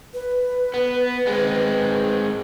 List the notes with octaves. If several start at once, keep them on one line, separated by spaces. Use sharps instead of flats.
B4
B3
G#3 C4